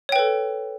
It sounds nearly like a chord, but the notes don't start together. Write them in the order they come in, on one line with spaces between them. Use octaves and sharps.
C#5 G5 B4 A4